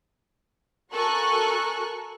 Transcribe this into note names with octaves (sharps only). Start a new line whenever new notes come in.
F#4 A4 A#4 G#5 C#6 F#6